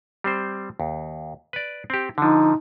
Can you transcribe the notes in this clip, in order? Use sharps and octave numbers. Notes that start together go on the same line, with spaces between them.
G3 C4 C5
D#2
B4 D5
C4 G4
D3 F3 D#4